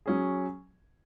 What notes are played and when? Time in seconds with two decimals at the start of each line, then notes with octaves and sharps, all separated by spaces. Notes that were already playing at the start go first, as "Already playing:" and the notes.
0.06 F#3 C#4 G#4